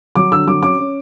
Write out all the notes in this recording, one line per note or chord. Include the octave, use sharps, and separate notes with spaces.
F#3 D6
D3 E6
F#3 D6
C#4 D6
C#4